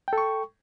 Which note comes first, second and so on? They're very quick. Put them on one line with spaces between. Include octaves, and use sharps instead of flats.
G5 A4 C#6